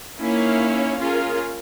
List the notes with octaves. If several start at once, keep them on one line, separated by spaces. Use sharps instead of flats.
A#3 C#4 D#4 E4 C#5 F5
C#4 F4 G#4 A#4